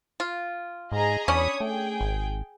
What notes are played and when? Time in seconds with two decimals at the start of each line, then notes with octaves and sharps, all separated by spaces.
0.20 F4
0.92 G#2 G#4 D#5 A#5
1.28 E2 C#4 D4 C#5 B5 D#6
1.60 A3 G#4 G5
2.01 G#1